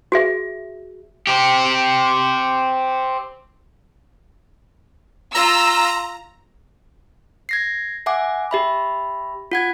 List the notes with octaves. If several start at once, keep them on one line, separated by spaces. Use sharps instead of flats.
F#4 G#4 E5
C4 G4
F4 A#5 E6
G#6 A#6 C7
E5 F#5 G#5 D6
G4 E5 B5
F4 F#5 G#6